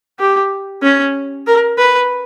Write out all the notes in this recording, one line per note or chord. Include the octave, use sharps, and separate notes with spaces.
G4
C#4
A#4
B4